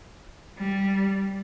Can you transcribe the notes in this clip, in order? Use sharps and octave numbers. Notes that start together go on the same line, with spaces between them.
G3